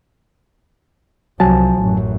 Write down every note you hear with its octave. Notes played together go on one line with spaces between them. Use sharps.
C2 F3 F#3 G#5 A5
A1 F#2